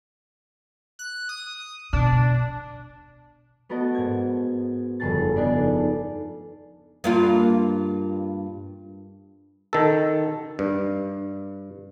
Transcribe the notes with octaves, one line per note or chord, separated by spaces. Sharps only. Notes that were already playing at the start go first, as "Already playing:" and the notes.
F#6
D#6
B2 D4
A3 B3 F#4 A4 A#4 D#5
G#2 G#6
F1 G2 C#3 G#4 A4 A6
B3 D4 D#4 G#4 A4
G2 A#3 F4
D#3 A4
G2